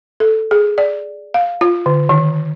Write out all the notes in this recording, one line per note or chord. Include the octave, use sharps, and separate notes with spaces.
A4
G#4
D5
F5
F4
D3
D#3